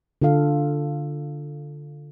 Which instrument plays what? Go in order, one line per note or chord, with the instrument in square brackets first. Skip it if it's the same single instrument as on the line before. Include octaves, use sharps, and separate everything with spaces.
[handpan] D3 F4 A4 F5